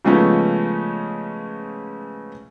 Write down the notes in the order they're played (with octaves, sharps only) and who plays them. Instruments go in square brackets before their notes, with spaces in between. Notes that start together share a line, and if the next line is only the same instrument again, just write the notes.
[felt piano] C#3 F3 G#3 A3 B3 C#4